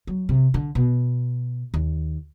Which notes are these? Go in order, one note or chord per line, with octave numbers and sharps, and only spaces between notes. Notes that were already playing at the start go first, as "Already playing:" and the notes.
F#3
C3
D3
B2
D#2